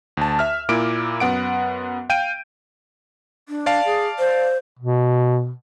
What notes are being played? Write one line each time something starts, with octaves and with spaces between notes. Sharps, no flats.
D2 A5
E5 F6
A#2 A#3 E4 D6 D7
F#2 B3 F#5 D7
F5 G5 G6 D7 D#7
D4
D5 F5 A5
G#4
C5
B2